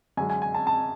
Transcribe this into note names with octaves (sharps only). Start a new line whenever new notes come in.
F#2 D3 G#3 G#5
G#5
G#5
A5
A5